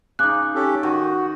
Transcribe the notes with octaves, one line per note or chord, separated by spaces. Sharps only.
C#3 D#4 D6 F#6
C#4 G4 A4
D#3 F#4